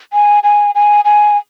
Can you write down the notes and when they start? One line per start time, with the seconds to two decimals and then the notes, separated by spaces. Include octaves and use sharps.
0.13 G#5
0.43 G#5
0.75 G#5
1.05 G#5